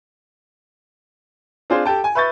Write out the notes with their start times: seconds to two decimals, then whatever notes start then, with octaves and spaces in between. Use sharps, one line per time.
1.70 C4 D4 F4 G#4 C5
1.85 G4 A4 G5 A5
2.04 G#5
2.15 B4 E5 C#6 G6 A6